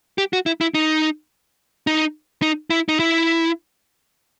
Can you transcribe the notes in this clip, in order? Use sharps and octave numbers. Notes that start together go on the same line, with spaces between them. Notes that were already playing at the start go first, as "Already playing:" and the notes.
G4
F#4
E4
E4
D#4
D#4
D#4
E4
D#4
E4